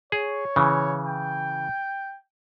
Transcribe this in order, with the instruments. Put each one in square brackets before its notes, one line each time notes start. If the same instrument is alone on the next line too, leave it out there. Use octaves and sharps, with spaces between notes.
[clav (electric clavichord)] G#4 [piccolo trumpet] C#5
[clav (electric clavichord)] C#3 E3
[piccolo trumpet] G5